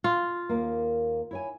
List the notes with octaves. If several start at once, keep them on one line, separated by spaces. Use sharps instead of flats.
F4
D#2 A#3
E4 C#5 G#5